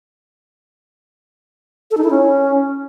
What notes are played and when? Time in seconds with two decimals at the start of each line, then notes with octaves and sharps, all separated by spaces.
1.91 A4
1.97 D#4
2.04 E4
2.10 C#4